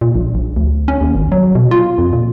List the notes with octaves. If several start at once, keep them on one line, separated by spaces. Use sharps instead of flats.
A#2
A#1
A#1
D2
C#4
D#2
G#1
F#3
B2
F4
F2
A#2